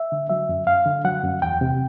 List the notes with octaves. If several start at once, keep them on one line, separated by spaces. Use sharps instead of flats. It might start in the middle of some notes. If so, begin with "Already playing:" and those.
Already playing: E5
D3
F#3 E5
F#2
F#2 F5
D3
F#3 F#5
F#2
E2 G5
C3